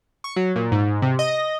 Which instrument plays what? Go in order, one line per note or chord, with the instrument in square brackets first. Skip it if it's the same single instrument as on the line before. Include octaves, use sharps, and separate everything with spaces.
[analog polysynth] C#6
F#3
A#2
G#2
C3
D#5